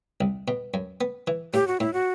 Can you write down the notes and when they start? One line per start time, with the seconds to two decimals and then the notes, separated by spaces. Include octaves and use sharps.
0.21 C2
0.48 B2
0.74 F#2
1.01 B3
1.27 E3
1.54 A2 G4
1.67 F#4
1.80 A2 E4
1.93 F#4